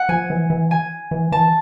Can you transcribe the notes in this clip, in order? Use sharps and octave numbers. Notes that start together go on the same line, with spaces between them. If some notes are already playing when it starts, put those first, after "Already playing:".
Already playing: F#5
F3 G#5
E3
E3
G#5
E3
E3 A5